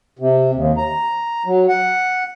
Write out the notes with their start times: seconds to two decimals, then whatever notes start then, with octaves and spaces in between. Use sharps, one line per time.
0.19 C3
0.54 D#2
0.77 A#5
1.46 F#3
1.68 F#5